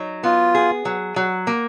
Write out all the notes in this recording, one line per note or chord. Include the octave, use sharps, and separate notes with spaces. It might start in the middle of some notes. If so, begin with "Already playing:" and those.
Already playing: F#3 D#4
B3 F4
G#4
F#3
F#3
A#3